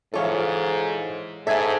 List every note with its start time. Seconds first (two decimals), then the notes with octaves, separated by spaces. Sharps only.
0.14 G#2 E3 F4 A4 C#5 F5
1.47 G#2 A4 E5 G#5 A5 G#6